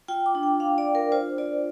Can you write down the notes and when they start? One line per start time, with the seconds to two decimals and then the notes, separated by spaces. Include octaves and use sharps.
0.08 F4 G5
0.26 D6
0.35 D4
0.43 G5
0.60 D4 F5
0.78 D5
0.86 D4
0.95 A#4
1.12 F4 C5
1.38 F4 D5